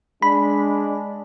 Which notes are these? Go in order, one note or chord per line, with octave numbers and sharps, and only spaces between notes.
G#3 D4 B5